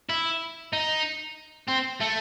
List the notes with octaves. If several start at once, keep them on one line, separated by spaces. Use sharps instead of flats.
E4
D#4
C4
A3